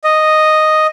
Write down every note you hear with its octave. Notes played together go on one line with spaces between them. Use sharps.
D#5